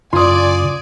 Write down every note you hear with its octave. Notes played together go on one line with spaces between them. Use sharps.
F#2 C#3 F4 D5 G#5 C6 D#6